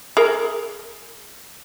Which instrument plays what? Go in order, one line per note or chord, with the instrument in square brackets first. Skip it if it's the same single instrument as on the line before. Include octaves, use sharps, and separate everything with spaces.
[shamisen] G#4 A#4